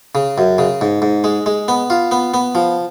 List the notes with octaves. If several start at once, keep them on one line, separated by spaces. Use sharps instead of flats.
C#3
F#2
C#3
G#2
G#2
G#3
G#3
B3
F4
B3
B3
F3